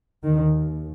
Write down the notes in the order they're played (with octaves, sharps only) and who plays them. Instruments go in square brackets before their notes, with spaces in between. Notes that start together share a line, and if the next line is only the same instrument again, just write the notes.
[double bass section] D#2 D#3